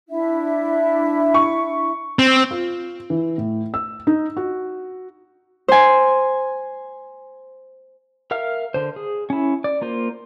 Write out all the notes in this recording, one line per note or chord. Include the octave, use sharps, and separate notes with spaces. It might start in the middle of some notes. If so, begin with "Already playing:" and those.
D4 E4 E5
C#6
C4
F4
E3
A2
E6
D#4
F#4
C5 G#5
A#4 E5 F5 F6
D3 C5
G#4
C#4 E4
D5
A#3 F4 C5